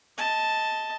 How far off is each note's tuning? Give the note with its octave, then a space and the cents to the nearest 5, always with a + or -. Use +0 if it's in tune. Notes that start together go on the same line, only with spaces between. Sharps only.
D#5 +25 A5 +0